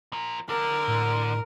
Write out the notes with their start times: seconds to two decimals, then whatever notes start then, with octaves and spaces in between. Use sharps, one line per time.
0.13 F3 A#4
0.49 D3 A#4
0.88 A2